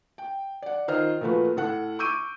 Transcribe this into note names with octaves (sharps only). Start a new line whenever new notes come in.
G5
D5 F#5
D#3 F4 C5 D#5 F6
A#2 F3 A3 F#4 B4
A2 A4 F#5 F#6
C#6 D6 E6 G6 D7 D#7